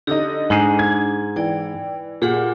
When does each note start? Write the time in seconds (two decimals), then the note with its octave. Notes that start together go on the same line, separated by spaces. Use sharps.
0.07 D3 D#4 G4 D#6
0.50 G#2 D4 G#4
0.79 G#6
1.36 E3 D5 G5
2.22 A#2 G4 G#4 F#5